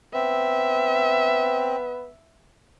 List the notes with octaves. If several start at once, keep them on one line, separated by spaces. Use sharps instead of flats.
B3 C4 E5